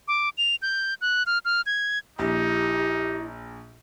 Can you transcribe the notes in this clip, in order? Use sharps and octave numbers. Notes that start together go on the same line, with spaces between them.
D6
F7
G6
F#6
F6
F6
G#6
A#1 D#4 E4 G4